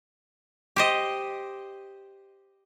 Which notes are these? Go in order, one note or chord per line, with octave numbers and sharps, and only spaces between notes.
G4 C5 D#5